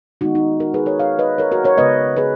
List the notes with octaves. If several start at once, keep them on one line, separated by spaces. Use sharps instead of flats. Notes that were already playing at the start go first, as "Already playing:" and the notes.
D#3 G#3 B3 D#4 F#4
D#4
F#4 A#4
G#4 B4
A#4 C#5
C#5 F5
B4 D#5
A#4 C#5
F#4 A#4
A#4 C#5
C#3 G#3 B3 B4 D#5
G#4 B4